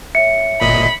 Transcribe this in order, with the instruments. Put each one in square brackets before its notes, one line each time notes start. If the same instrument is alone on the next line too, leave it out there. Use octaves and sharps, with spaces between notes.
[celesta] C#5 E5 [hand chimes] C#7
[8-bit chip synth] G1 A#2 D#5 [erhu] B5